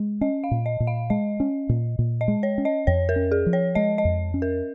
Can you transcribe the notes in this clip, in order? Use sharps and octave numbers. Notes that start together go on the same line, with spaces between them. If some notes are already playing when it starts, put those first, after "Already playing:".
Already playing: G#3
C#4 D#5
F5
A#2
D#5
A#2
F5
G#3 D#5
C#4
A#2
A#2
D#5
G#3
C#5
C#4
D#5
F2 C#5
A#4
C#4
G#4
F3
C#5
G#3 D#5
D#5
F2
C#4
A#4